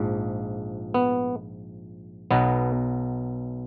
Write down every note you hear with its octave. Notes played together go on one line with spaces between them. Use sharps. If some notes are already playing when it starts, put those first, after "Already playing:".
Already playing: A#1 G#2 F3
B3
B1 B2 F#3 B3